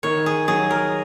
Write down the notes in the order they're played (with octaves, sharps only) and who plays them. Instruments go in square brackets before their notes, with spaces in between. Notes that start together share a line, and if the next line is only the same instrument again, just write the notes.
[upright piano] D#3 [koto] C#5
[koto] G#4
[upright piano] F#3 [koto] G#4
[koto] A#4